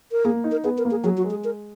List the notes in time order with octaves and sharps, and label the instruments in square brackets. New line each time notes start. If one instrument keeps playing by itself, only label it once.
[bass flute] A#4
[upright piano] A#3 [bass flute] G#4
[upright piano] D#4
[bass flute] A#4
[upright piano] B3 [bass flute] G#4
[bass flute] A#4
[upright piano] A#3
[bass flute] G#4
[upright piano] F#3 [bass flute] G#4
[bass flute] F#4
[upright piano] G#3
[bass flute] G#4
A#4